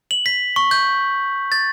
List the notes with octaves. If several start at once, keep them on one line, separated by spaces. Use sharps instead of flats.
F#7
B6
C#6
G6
A6